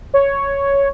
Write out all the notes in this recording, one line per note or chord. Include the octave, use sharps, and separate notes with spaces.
C#5